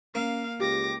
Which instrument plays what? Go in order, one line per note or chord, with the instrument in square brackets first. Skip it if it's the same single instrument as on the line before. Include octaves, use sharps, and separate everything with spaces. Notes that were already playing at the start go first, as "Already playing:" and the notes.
[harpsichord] A#3 [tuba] C#4 [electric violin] F5
[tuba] C#2 [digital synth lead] G4 [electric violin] D6 A#6